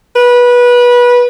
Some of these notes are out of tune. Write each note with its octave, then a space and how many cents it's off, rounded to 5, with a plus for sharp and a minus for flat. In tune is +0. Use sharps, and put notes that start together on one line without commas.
B4 -20